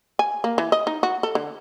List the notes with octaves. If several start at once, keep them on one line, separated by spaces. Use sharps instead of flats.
G#5
A#3
E3
D#5
D#4
F#4
A4
D3